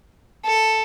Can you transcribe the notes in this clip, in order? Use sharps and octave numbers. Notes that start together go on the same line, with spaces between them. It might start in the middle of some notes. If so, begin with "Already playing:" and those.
A4